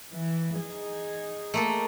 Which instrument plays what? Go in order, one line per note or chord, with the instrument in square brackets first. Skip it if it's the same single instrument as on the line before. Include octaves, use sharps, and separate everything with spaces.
[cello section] E3
D#4 G#4
[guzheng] A3 A#3 A4